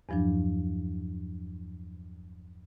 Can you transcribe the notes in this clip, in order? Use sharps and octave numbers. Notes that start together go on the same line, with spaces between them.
E2 G2 F3 F#3 D4